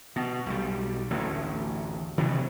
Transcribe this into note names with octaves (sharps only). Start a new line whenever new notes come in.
B2
B1 G3
A1 D2 A2
C3 D#3 E3 F#3